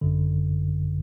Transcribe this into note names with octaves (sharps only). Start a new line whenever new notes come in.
G#1 F#2 D3